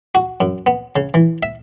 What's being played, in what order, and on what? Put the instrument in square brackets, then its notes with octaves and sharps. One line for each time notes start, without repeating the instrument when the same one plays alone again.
[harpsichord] F#4
F#2
B3
C#3
E3
E5